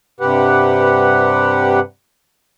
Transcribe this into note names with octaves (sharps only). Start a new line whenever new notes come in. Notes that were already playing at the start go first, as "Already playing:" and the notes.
G2 C3 G4 B4 F#5